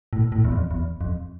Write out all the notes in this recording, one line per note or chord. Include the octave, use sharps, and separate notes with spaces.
A2
A2
E2
F2
E2
F2